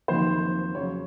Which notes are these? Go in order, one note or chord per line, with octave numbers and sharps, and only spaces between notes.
F1 F2 D#3 F#3 A#3 C5
F2 C#3 F#3 C#4 C#5